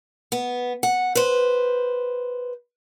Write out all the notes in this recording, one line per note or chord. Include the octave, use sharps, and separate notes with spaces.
B3
F#5
B4 C5